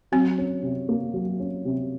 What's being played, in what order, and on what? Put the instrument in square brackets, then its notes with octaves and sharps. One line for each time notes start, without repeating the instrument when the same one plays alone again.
[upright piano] F#3 [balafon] C4
[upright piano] C#4
C3
A#3
F#3
C#4
C3